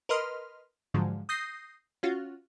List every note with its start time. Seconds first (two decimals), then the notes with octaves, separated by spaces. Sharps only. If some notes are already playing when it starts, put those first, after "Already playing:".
0.09 A#4 B4 D#5 C6 F6
0.94 G#2 D3 F3 F#3 G#3
1.29 D#6 G6 A#6 C7
2.03 C#4 F4 F#4